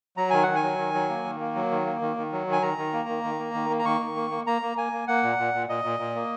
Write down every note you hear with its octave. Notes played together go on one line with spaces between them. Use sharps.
F#3 A#5
D#3 G#5
F#5
D#3
G#5
F#3
D#3
F#3
A#3
D#3
A#3
F#3
D#3
A#3
D#3
D#3
F#3
D#3
G#5
D#3 A#5
D#3
A#3
D#3
D#3
A#3
D#3
A#3
A#5
D#3 C#6
D#3
A#3
A#3
A#3 A#5
A#3
A#3 G#5
A#3
A#3 F#5
A#2
A#2
A#2
A#2 D#5
A#2
A#2
A#3